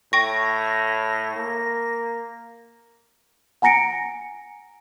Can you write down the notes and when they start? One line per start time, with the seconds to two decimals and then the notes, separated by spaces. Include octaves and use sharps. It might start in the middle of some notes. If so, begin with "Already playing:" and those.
0.13 A2 G5 C#6 A#6
1.36 A#3
3.62 F#5 G#5 A#5 A#6 C#7 D7